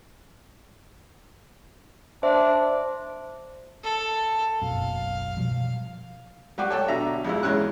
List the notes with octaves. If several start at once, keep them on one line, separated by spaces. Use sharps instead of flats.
D4 C5 E5
A4
F#1 B1 F#2 F5
B2 F3 G3
F#3 G3 F#4 D6
A4 C#5 G5 A5
B2 D3 E5 A#5
F2 G#3 E4
E2 G#3 C#4 F#6